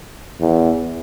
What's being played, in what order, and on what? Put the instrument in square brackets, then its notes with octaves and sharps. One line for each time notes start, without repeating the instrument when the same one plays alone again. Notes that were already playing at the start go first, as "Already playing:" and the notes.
[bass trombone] E2